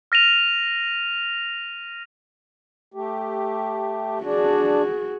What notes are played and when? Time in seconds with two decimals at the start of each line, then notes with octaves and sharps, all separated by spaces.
0.12 F6 A#6 D#7 F7
2.94 A3 G4
4.24 D4 F#4 G#4